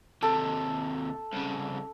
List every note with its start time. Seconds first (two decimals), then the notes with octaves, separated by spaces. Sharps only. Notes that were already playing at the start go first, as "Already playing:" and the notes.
0.22 D#2 C3 A4
1.33 C2 C#3